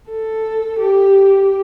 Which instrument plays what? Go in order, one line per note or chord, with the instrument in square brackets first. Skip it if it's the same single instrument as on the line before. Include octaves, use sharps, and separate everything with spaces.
[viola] A4
G4